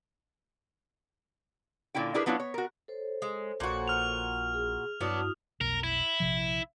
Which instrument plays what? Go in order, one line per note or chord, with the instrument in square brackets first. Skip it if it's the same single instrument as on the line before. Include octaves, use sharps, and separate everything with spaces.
[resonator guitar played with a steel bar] A#2 D3 C#4 E4 G5
D4 E4 G4 G#4 A#4 B4
F#3 B3 D4 E4 F4 C#5
C#5
F#4 A#4
[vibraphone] A4 C5 C#5
[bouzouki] G#3
[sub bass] A#1 [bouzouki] A#2 F#4
[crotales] F6 F7
[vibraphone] G#4
[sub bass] G2 [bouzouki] F#3 B3 D4 [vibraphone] E4 F#4 D#6
[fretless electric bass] F1 B1 [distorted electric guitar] A#4
[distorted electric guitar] E4
[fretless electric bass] A#1 C3 F3